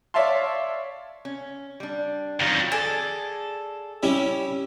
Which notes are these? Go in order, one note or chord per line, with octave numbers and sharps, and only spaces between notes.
C#5 D5 E5 F5 A5 C6
C#4
G3 D4
F2 D#3 F#3 G3
G#4 A4 D5
G3 C#4 E4